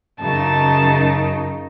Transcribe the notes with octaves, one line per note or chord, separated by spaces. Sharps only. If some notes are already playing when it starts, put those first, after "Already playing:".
F#2 C#3 D#4 A5